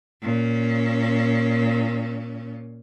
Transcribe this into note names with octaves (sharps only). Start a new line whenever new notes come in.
A#2 C#4